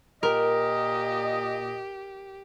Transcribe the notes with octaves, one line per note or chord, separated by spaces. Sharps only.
A#2 G4 A#4 D#5